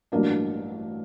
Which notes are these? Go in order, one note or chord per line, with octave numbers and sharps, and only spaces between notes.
A1 G2 F#3 A#3 D4